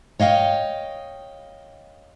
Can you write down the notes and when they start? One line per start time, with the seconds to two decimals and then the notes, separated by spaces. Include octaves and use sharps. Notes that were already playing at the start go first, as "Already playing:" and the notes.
0.20 C#5 D#5 F5 G5